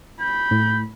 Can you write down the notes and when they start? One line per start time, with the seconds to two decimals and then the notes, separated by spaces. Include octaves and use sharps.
0.21 B5 G6
0.51 A2